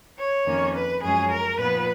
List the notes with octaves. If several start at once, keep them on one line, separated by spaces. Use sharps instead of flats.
C#5
F2 D#3 A#3 C#4
B4
F#2 F3 G#3 C#4 G#4
A#4
A#2 F3 B3 D#4 B4